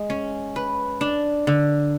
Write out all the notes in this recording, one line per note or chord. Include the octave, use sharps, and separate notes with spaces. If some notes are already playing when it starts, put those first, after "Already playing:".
Already playing: G#3
C#4
B4
D4
D3